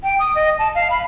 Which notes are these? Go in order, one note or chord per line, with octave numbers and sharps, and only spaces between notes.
G5
D#6
D#5
A5
F5
B5